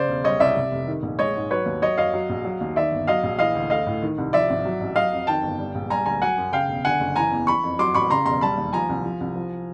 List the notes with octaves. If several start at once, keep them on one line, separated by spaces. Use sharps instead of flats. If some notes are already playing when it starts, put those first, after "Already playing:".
Already playing: C#3 C5 D5
E1
G3 C#5 D#5
C2 D5 E5
C3
F1
D#3
A#1
G#3 C#5 D#5
G#2
F#3 B4 C#5
D#2
F#3 C#5 D#5
F#2 D#5 F5
F#3
A#1
F#3
D#2
D#3 D5 E5
G1
F#3 D#5 F5
A#1
E3 D#5 F5
D2
A3 D#5 F5
A2
D#3
C2
F3 D5 E5
G#1
F#3
A1
F#3 D#5 F5
F2
D#3 G5 A5
G1
G3
A#1
G3 G#5 A#5
D2 G#5 A#5
F#3 F#5 G#5
F#2
C#3 F5 G5
E1
D3 F#5 G#5
F#1
E3 G#5 A#5
E2
E3 B5 C#6
F2
F#3 C6 D6
A1 B5 C#6
C#3 A#5 C6
E1 A#5 C6
G3 A5 B5
D#2
F3 G#5 A#5
C2
F3
C2
F3